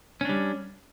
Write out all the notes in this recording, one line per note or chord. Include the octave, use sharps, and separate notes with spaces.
G3 C#4 D4